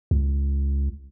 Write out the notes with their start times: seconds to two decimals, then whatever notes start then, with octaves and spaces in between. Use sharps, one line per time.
0.11 C#2